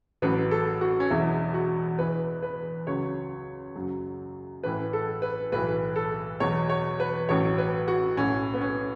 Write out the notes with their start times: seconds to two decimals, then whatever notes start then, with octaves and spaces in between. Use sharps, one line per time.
0.22 A1 A2 F#3 B4
0.51 A4
0.81 F#4
1.00 C#4
1.10 E1 E2 B2 F#3 E4
1.54 F#4
1.99 E1 E2 E3 B4
2.43 B4
2.87 C#2 C#3 F#3 C#5
3.75 F#1 F#2 F#3
4.64 A1 A2 E3 B4
4.93 A4
5.22 B4
5.52 B1 A2 E3 B4
5.96 A4
6.40 E2 B2 F#3 C#5
6.70 C#5
7.00 B4
7.29 A1 A2 F#3 C#5
7.58 B4
7.88 F#4
8.17 B1 A2 F#3 C#4
8.54 B3
8.61 C#4